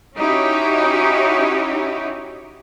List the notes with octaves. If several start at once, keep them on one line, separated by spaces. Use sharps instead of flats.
C#4 D#4 E4 F#4 G4 C#5